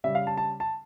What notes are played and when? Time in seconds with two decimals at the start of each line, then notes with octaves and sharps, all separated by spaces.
0.04 C#3 G3 E5
0.15 F5
0.27 A5
0.37 A5
0.60 A5